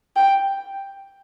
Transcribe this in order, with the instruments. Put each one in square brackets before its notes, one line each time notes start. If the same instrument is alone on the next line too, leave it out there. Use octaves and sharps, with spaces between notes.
[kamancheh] G5